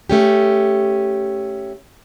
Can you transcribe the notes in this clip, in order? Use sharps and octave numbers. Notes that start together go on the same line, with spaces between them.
A3 C#4 G4